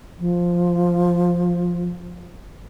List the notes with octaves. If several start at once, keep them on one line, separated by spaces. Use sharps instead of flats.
F3